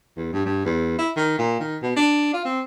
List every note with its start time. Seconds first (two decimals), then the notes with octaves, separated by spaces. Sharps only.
0.17 E2
0.33 G2
0.46 G2
0.65 E2
0.98 E4
1.16 D#3
1.39 A#2
1.60 D#3
1.82 B2
1.96 D4
2.33 F4
2.45 C4